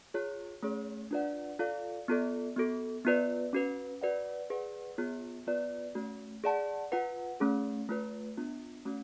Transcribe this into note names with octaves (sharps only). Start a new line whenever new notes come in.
F4 G#4 C#5
A3 C#4 G#4 C#5
D4 F4 B4 D5 F#5
F4 A4 D5 F5
B3 F4 A4 D5
B3 F#4 A4
B3 F4 B4 D5
C#4 F#4 B4
F#4 B4 D5 F#5
G#4 B4 D5 F#5
B3 F4 G#4 C#5
B3 F4 B4 D5
A3 C#4 F#4
G#4 D5 F#5 A5
F4 B4 F#5
A3 C#4 G#4
A3 F4 B4
B3 D4 F4
A3 C#4 F#4